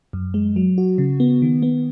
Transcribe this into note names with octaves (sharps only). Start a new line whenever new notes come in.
F#2
G#3
F#3
F#4
C#3
B3
D#3
B3